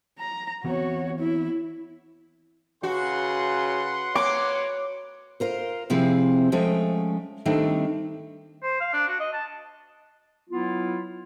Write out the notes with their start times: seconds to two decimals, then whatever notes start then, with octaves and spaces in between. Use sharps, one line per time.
0.19 A#5
0.64 E3 B3 C4 F#4 C#5
1.19 E4
2.83 C#3 F#4 B4 F#5 C6
4.15 A#3 C#5 D6
5.40 F4 A#4 C5
5.90 C3 F3 C4 E4 G#4
6.52 F3 G#3 A3 C#4 G5
7.46 D#3 G3 A3 C4 D4
8.63 C5
8.81 F5
8.93 D4
9.08 F#4
9.20 D#5
9.33 A5
10.50 F#3 B3 E4 F4